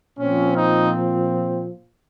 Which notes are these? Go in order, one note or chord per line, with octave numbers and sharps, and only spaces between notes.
A#2 F3 C4 C#4
D#4